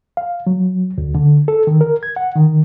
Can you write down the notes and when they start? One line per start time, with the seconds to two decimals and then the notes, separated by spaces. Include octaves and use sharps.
0.17 F5
0.47 F#3
0.98 D2
1.15 D3
1.48 A4
1.67 D#3
1.81 A#4
2.03 G#6
2.16 F#5
2.36 D#3